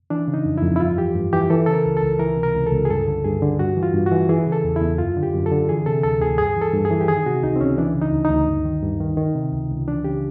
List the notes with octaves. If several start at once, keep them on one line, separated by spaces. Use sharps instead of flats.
E3 D4
C#3
D#4
F2
E4
F2
E4
G2 F4
E3 G4
G2
E3 G4
E3 A4
C#3 A4
A#4
C#2
A4
C#2
E3 A#4
C3
A#4
C#2
A4
C#2
G#4
G2 A4
D3
G2 G#4
D3
G2 F#4
E3
F4
G2
F#4
E3
E3 G#4
C#3
A4
E2
E4
E2
F#2 F4
D3
G4
F#2
A4
D3
E3 G#4
C3 A4
D2 A4
D2 G#4
G2 G#4
E3
A4
G2
G#4
E3
G4
D#3 G#4
C3 F#4
C#2 D#4
C4
C#2 C#4
E3 D4
C#3
D#4
D2
D#4
D2
G2
D#3
G2
D#3
D#3
C3
C#2
C#2
E3 D4
C#3 G4